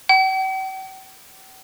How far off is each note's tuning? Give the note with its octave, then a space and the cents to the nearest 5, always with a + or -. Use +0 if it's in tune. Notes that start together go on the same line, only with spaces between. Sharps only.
G5 -45